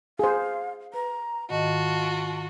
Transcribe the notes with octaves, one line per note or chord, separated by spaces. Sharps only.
G#4 C5 F5
B4 A#5
G#2 D#3 F4 F#4 D#5 A5